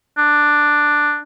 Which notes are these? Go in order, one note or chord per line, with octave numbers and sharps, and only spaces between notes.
D4